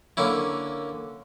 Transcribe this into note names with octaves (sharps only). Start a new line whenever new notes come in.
D3 A#3 C#4 E4